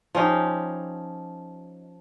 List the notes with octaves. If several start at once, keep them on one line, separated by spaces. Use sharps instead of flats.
F3 C#4 D#4 G4